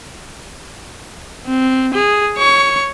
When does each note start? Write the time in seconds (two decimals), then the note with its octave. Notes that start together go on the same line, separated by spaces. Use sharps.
1.46 C4
1.94 G#4
2.37 C#5 C#6